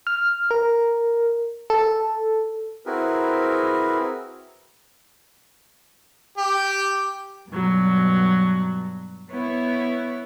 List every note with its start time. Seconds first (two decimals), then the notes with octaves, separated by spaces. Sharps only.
0.07 F6
0.51 A#4
1.70 A4
2.85 C4 E4 F#4 G#4 A#4 B4
6.38 G4
7.49 G2 B2 F#3
9.31 B3 E4 C#5